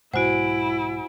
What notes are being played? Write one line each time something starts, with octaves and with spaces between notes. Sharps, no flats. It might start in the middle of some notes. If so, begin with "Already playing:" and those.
B1 G#2 E4 F#4 C5 F#5 G#5 D7